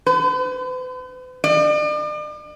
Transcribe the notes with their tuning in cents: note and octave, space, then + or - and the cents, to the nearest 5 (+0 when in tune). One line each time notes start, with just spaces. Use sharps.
B4 +45
D5 +45